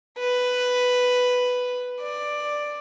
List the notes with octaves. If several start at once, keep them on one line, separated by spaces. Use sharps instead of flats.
B4
D5